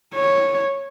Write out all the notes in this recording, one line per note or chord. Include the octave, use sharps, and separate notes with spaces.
C#5